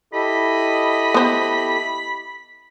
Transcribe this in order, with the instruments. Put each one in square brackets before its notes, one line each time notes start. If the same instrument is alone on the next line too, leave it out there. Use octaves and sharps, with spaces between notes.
[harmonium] E4 G4 A4 [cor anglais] D#5 [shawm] B5
[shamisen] B3 C5